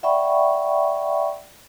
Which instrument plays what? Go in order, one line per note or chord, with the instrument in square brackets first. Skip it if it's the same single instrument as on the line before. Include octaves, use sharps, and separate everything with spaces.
[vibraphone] D5 E5 F#5 G5 B5 C#6